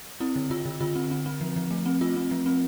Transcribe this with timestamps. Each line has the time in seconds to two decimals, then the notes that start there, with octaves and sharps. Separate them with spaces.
0.20 C4 E4
0.36 D3
0.50 D3 F4
0.65 D3
0.81 D3 F4
0.95 C4
1.11 C4
1.26 C4
1.41 F3
1.56 F3
1.70 A3
1.86 C4
2.01 A3 F4
2.16 C4
2.31 F3
2.46 C4